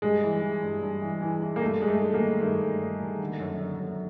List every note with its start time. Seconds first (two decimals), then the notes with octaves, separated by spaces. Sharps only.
0.02 G2 G#3
0.23 E3
0.42 E3
0.63 G2
0.83 G2
1.02 E3
1.21 E3
1.42 E3
1.56 A#3
1.61 G2 A3
1.81 G2 G#3
1.88 A3
2.01 G2
2.14 A#3
2.21 D#3
2.40 G2 A3
2.60 G2
2.81 G2
3.01 D#3
3.20 D3
3.40 F#2
3.60 D3
3.80 F#2